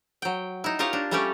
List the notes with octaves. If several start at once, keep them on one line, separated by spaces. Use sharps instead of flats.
F#3 G5
D#4 E4
F4 G4 A#4 C#5 D#5 F5
D4
G3 A3 C#4 G4 C#5 D5